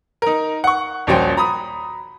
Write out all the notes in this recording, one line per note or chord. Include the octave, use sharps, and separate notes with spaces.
D#4 A#4
F#5 C#6
D#1 A#1 C#4 F#4 C5 G5
A#5 B5 D#6